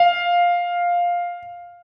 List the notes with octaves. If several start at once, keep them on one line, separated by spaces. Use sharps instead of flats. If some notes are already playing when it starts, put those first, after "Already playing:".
Already playing: F5